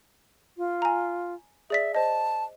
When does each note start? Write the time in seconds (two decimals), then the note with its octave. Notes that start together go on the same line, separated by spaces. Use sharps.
0.57 F4
0.82 G#5 A#5
1.70 G#4 D5 E5 B6
1.95 C5 D#5 A5